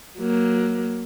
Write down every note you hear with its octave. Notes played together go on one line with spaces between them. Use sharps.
F#3 A#3